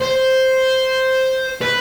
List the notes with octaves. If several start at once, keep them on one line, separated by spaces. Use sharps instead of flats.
C5
B4